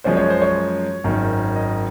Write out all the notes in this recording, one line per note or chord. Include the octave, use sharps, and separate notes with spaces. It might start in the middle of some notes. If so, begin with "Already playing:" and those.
F#2 F3 G#3 C#4 C5
C#5
C5
C#5
G#1 F#2 D#3
D#5